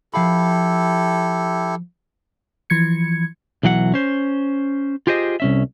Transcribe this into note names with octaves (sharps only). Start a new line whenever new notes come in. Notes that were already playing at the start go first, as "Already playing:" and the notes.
F3 E4 G4 A4 F5 B5
E3 F3 G#6 C#7
B1 E3 F#3 D5 F#5
C#4 C5
F4 G4 G#4 C5 D#5
C2 C#4 E5